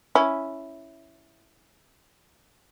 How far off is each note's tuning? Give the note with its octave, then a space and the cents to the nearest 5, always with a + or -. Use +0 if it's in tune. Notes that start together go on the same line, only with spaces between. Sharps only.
C#4 +0 E4 +0